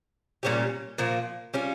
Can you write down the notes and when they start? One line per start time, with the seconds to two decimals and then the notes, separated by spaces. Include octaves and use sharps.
0.43 A#2 G3 C#4 G4
0.98 A#2 F3 A#3
1.54 G3 C#4 F4